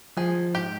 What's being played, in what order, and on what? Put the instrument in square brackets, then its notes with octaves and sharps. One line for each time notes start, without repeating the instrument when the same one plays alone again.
[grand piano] F3 [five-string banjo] G#4
[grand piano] G#2 [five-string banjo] G4